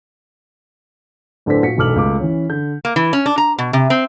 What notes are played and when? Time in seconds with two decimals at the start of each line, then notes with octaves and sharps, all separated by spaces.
1.46 D1 D3 D4 A4 C5 B6
1.62 A#2 F#4 B6 C#7
1.77 E1 B1 A4 D6 F6 F#7
1.96 C#2 A3 D6
2.19 E3 C#4
2.49 D3 G6
2.85 A#3
2.96 E3
3.13 C#4
3.26 D4
3.38 A#5
3.58 B2
3.73 C3
3.90 C4